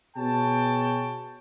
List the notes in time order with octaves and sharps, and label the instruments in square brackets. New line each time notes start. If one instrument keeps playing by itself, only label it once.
[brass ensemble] B2 G#4 C#5 G5 A5